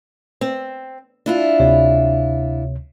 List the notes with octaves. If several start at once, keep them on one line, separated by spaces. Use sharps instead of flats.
C4
D4 E4 F4
D2 C3 C#5